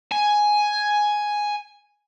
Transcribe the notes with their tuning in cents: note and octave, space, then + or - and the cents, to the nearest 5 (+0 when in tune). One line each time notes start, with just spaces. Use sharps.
G#5 +5